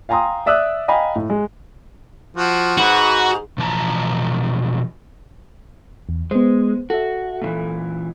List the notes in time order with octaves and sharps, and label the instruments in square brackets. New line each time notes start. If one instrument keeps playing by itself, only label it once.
[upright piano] F5 G5 G#5 A#5 C6 D#6
D5 E5 D#6 E6 F#6
D#5 F5 G5 G#5 A#5 B5
A2
G#3
[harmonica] F3 F#4
[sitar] G#2 [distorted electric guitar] F#4 [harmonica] B4
[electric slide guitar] B2 E3 F3 A5 A#5
[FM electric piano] E2
[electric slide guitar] G#3 [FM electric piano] B3 C5
[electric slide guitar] F#4 [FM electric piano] A4 E5
[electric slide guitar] A#2 D#3 E3